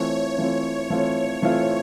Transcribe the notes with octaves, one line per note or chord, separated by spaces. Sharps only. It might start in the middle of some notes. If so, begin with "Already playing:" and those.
Already playing: E3 A3 C4 F4 C#5
E3 A3 C4 F4
E3 A3 C4 F4
E3 A3 C4 F4